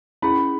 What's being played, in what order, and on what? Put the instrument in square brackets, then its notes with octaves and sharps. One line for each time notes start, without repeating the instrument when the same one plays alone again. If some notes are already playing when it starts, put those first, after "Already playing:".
[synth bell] C#4 E4 G#4 [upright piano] B5